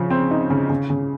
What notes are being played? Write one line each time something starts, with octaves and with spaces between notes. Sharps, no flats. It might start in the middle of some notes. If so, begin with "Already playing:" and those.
Already playing: C#3 F3
C4
D#4
C#3
C#3
C#3